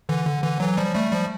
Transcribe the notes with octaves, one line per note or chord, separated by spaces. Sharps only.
D3 E3
D3
D3 E3
E3 F#3
F3 G3
G3 A3
F3 G3